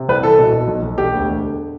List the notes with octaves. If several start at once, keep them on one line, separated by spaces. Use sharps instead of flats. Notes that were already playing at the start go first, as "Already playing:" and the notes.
Already playing: C3
C2 B4
E3 A4
B2
B2
B1
B1
E1 G4
D2
E1
D3